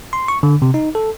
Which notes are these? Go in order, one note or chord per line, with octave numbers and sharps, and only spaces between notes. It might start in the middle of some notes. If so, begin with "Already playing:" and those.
C6
C#6
D3
C3
D#4
A4